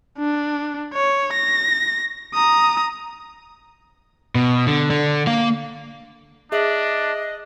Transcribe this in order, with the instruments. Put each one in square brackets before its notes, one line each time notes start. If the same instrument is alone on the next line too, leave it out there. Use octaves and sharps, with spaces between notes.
[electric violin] D4
C#5
A#6
A#5 D#6
[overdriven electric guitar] B2
D3
D3
A#3 F5
[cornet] D4 [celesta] G#4 E5 F#7 [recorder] D#5